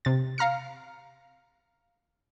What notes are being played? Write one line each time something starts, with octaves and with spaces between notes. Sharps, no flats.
C3 A6
F5 A#5 F6 C#7